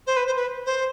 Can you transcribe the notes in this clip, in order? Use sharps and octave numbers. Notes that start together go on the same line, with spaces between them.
C5
B4
C5
B4
C5